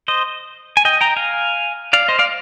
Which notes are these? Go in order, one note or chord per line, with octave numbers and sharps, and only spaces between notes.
C5 D#5
G#5
D#5 G5
G5 A#5
F5 G#5
D5 F5
C5 D#5
D5 F5